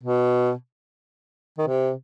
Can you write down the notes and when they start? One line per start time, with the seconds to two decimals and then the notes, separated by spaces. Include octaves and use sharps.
0.03 B2
1.58 D#3
1.67 C3